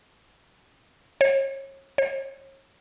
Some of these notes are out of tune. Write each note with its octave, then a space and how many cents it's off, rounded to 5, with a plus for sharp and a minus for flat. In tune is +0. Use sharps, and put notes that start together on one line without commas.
C#5 -35
C#5 -40